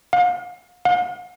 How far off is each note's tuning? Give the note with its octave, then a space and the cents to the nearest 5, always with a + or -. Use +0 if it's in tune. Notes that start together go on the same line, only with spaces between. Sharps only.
F5 +40
F5 +45